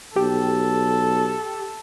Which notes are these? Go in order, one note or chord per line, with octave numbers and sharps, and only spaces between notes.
B1 G4 A4